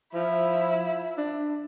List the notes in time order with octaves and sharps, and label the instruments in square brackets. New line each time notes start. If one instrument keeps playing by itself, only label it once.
[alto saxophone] F3 [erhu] E4
[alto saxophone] D4